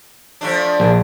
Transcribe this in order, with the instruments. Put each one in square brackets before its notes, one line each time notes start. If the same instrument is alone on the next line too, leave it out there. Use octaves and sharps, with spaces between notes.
[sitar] F3 A3 D4
[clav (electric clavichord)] A#1